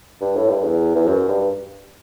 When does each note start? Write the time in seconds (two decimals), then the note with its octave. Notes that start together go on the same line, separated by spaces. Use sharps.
0.21 G2
0.36 A2
0.49 G2
0.64 E2
0.95 E2
1.07 F#2
1.28 G2